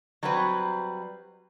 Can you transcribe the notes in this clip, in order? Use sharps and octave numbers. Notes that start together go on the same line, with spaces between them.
F#3 G3 C4 F#4 B4